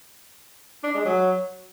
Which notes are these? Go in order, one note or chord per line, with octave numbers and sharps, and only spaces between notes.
D4
G#3
F#3